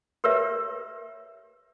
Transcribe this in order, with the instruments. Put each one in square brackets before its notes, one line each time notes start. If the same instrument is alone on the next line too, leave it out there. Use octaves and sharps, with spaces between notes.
[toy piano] G4 A#4 B4 C#5 E5